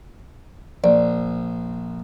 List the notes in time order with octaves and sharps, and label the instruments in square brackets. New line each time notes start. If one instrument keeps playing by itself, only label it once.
[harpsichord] A#1 [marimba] D5